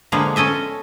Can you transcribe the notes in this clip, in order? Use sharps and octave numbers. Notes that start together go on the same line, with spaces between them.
D3 F3 G#3 A#3 B3
C#4 A4 D#5 E5